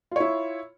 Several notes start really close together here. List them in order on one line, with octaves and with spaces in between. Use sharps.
F4 C#5 E4